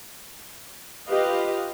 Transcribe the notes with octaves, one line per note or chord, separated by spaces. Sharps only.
F4 G4 B4 D#5 F5